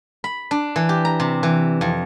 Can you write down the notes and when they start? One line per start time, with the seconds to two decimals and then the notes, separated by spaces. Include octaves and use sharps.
0.24 B5
0.51 D4
0.76 E3
0.89 G4
1.05 A#5
1.20 C3
1.43 E3
1.81 F2